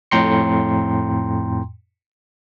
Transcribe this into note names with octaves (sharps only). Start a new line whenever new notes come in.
F2 A2 G5 A#5 C6 C#7